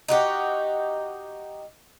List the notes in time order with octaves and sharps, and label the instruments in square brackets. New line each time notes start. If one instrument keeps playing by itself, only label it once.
[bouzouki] D#4 F#4 G4